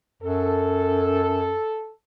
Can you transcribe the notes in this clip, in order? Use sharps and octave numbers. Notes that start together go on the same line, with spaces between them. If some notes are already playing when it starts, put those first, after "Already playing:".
F#2 A4